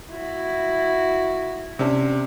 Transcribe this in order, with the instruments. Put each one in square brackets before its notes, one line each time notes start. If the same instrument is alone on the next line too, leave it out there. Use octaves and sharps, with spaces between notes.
[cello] E4 F#4
[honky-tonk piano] C3 C#4 D4